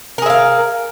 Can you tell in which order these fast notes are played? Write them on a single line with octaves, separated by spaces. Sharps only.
A#4 G#4 E5 F5